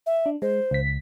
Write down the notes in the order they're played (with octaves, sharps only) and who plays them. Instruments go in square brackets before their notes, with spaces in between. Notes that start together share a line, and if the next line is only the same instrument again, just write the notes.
[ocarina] E5
[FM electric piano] D4
[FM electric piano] G#3 [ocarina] C5
[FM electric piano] C#2 B6